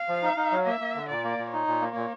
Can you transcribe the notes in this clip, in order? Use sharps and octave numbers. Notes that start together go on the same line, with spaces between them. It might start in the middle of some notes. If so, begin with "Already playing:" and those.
Already playing: F5
F3
D#4
D#4
F#3
A#3 E5
A#3
D3
A#2 D5
A#3
A#2
D#4 C#5
A#2
A#3
A#2